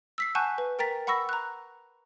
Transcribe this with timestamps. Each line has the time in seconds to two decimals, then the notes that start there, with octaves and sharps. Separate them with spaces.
0.18 E6 B6 C7
0.35 F#5 G#5 A5 C#6 F#6 G6
0.58 B4
0.79 A#4 G5 A#5 A6 B6
1.07 F#5 B5 C#6 E6 A#6
1.29 A#5 F#6